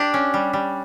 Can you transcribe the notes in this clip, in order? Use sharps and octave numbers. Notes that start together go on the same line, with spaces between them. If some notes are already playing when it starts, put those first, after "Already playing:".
Already playing: D4 G4
C#4
G3
G3